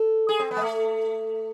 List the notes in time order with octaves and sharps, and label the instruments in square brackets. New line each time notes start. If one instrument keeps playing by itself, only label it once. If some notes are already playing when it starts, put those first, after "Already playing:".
Already playing: [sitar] A4
G#4
C4
B3
G#3
A3